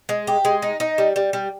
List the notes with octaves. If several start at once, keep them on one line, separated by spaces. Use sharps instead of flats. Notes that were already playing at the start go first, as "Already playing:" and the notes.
G#3
G4
G#3
D#4
D#4
G3
G3
G3